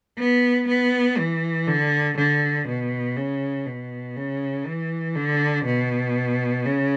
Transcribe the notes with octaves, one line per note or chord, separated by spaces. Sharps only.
B3
B3
E3
D3
D3
B2
C#3
B2
C#3
E3
D3
B2
C#3